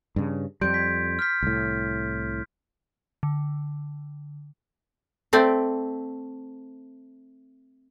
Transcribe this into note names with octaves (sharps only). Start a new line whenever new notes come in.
G2 C#3
F2 G3 C6 G6 D7
G#6 B6
F6 G6 B6
C2 A2
D3
A3 C4 D5